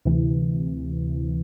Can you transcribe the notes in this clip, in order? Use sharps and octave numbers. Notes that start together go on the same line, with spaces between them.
D2 C3 E3